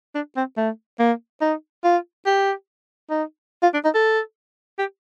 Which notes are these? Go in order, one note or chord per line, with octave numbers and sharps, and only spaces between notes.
D4
C4
A3
A#3
D#4
F4
G4
D#4
F4
D4
D#4
A4
G4